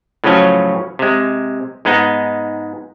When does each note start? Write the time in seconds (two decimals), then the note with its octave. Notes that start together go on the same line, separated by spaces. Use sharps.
0.24 A2 C#3 F3 F#3 C#4
0.99 C3 G#3
1.85 G#2 G#3 B3 D#4